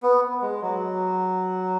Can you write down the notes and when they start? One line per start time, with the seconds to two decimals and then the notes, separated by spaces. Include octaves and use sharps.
0.03 B3
0.42 G#3
0.62 F#3